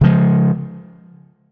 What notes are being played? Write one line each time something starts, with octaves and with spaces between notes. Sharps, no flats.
C#3 F3 G#3